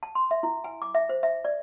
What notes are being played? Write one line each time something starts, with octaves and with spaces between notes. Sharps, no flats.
A5
C6
E5
E4
G#5
D6
E5
C5
E5
D5